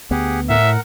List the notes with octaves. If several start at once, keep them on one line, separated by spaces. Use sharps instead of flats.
D2 B3 G4 G#4 F#5
A2 A#4 E5 F#5